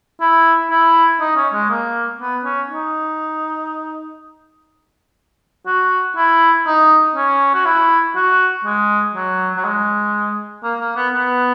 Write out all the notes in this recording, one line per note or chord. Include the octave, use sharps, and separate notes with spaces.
E4
E4
D#4
C#4
G#3
A#3
B3
C#4
D#4
F#4
E4
D#4
C#4
F#4
E4
F#4
G#3
F#3
F#3
G#3
A#3
A#3
B3
B3